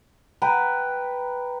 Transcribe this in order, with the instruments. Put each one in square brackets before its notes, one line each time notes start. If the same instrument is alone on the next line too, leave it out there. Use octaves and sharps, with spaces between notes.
[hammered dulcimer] B4 G5 A#5